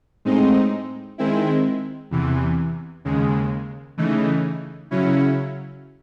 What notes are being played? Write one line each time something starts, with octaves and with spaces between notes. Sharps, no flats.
A2 G#3 C4 D#4
D#3 G#3 C4 E4
E2 C3 E3
D#2 C#3 G#3
C#3 E3 A3 D#4
C#3 F#3 C#4 E4